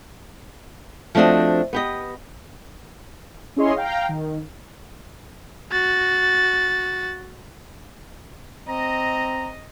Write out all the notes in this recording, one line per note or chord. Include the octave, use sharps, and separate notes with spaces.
F3 A3 C4 D4 F#4 D#5
B3 G4 D#5
C#4 E4 G#4 C#5 D#5 C6
F5 G5 A#5
D#3
F#4 A6
C4 D#5 A#5